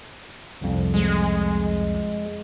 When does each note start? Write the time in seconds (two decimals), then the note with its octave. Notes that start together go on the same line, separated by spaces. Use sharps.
0.61 C2 F2
0.94 G#3